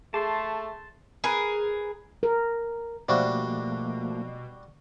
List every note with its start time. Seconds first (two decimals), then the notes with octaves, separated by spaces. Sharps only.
0.14 A3 G#4 A5 C6
1.24 G#4 A#4 B4
2.23 A#4
3.09 B2 F3 G3 A3 A#3 D4 F#4